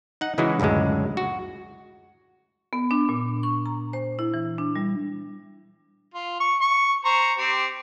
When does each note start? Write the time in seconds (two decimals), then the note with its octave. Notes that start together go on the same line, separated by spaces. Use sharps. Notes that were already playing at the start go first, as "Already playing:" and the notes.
0.21 D#4 F#5
0.38 C#3 E3 G#3 D#4 E4 F#4
0.60 C#2 F#2 A2 D3 G#3
1.17 F#4
2.73 B3
2.91 D4
3.09 A#2
3.43 C#6
3.66 A#5
3.93 C5
4.19 E4
4.34 E3
4.58 D4
4.76 G3
6.14 F4
6.40 C#6
6.61 C#6
7.05 C5 A#5 C#6
7.38 C4 G4